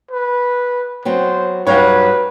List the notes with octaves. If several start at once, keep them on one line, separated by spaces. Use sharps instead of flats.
B4
F#3 B3 C4 C5
G2 F#3 D#4 B4 C#5 F5 G5